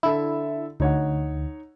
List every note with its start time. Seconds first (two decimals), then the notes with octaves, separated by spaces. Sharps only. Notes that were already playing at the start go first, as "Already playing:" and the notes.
0.03 D3 E4 A4 E5
0.80 D2 D#4 C#5 F#5